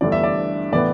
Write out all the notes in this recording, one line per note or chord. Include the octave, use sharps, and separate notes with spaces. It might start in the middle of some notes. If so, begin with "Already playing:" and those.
G1 G2 E3 A3 D5
E5
D5
A2 E3 B3 D5